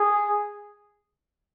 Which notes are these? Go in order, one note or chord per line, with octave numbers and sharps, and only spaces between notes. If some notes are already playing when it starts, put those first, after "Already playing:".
Already playing: G#4